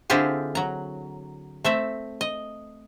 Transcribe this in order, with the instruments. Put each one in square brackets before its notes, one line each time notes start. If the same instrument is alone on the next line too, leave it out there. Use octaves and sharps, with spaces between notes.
[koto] D3 C4 E4 F4 G4 G#4
F#3 A#5
A3 C4 E5
D#5